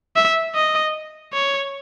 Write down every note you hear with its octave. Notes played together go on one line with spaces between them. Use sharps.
E5
D#5
C#5